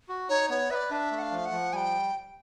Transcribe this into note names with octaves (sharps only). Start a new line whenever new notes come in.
F#4
D#4 C#5
B3 C#5
B4 D5 E5
D4 E5
A3
F#5
F5
F3
F#5
F3
G3 G5 G#5